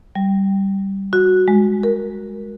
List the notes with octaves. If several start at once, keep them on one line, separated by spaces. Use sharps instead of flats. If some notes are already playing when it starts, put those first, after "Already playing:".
G3
F#4
G#3
A#4